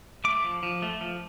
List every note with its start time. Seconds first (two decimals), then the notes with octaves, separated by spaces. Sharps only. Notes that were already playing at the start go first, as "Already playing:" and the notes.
0.24 A3 D6
0.44 F3
0.63 F3
0.82 A3
1.01 F3